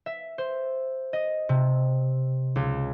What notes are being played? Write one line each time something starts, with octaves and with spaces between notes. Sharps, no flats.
E5
C5
D#5
C3
C#2